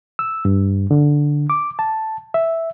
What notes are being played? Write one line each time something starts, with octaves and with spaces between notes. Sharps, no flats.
E6
G2
D3
D6
A5
E5